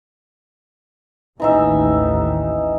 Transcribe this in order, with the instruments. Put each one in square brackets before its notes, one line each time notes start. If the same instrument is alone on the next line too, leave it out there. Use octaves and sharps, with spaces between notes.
[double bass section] A1 D#2 [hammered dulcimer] E3 D#4 E5